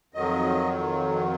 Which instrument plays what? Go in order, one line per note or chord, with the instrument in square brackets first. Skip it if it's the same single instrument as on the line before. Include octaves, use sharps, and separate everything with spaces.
[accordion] F2 D#3 F#3 D#5